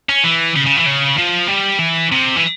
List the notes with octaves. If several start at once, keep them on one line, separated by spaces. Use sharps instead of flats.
C#4
E3
C#3
C#3
E3
C#3
F3
G3
E3
C3
E3